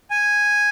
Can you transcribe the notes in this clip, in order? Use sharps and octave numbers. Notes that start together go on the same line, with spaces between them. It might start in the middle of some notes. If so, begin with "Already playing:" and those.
G#5